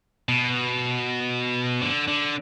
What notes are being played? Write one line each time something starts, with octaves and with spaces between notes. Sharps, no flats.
B2
D3
D3